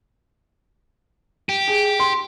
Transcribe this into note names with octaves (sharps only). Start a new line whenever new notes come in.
G4
G#4
C6